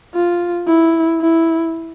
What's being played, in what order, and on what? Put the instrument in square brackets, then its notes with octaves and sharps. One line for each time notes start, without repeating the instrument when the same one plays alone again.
[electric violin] F4
E4
E4